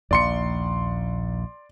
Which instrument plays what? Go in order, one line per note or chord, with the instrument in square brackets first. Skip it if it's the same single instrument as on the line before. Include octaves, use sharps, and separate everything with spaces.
[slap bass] A#1 D#2 [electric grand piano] D5 C6 C#7